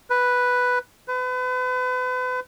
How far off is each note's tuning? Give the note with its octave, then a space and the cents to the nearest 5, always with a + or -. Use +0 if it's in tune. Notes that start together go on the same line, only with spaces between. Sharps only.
B4 +0
B4 +35